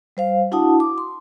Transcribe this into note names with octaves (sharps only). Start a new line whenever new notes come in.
G3 C5 F5
D4 E4 F#4 F#5 A5 D#6
D6
C6